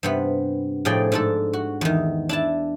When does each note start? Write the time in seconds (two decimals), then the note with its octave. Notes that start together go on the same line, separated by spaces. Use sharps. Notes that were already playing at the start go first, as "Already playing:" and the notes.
0.03 G2 C3 B3
0.85 A2 F3 G#4 D5 G5
1.12 G#2 D4 A4
1.53 F#4
1.81 E2 D#3
2.29 D4 E4 A5